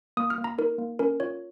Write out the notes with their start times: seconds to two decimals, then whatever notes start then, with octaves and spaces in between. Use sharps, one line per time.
0.17 A#3 D#6
0.30 F6
0.38 A#3
0.44 A#5
0.58 D#4 A#4
0.78 A#3
0.99 C#4 A#4
1.20 F4 C#5